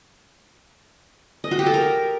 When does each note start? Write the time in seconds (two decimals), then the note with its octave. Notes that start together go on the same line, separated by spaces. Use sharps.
1.44 D#5
1.51 F#4
1.59 G4
1.66 A4
1.74 A#4